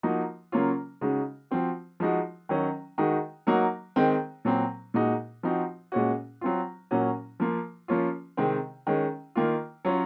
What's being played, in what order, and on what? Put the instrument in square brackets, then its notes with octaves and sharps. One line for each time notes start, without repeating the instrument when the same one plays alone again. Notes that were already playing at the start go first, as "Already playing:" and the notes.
[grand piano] F3 A#3 D#4 F#4
C#3 F#3 A#3 C#4 F4
C#3 G#3 D#4 F#4
F3 C4 F#4
F3 G#3 D#4 F#4
D#3 F#3 C#4
D#3 G#3 D#4 F#4
F#3 A#3 D#4 F#4
D#3 G#3 C4
A#2 F#3 C4
A#2 G#3 D#4 F#4
F3 C4 D#4 F#4
A#2 G#3 C#4 F#4
F#3 C4 F4
A#2 F#3 A#3 C#4 F#4
F3 A#3 F4
F3 A#3 C#4 F4
C3 D#3 G#3 C4
D#3 G#3 C#4
D#3 A#3 F4
F#3 C#4 F4